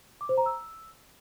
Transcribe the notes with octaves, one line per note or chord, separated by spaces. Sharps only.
D6
C5
A#5
E6